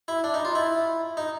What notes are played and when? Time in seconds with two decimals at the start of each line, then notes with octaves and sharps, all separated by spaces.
0.08 E4
0.24 D4
0.34 D#4
0.45 F4
0.55 E4
1.17 D#4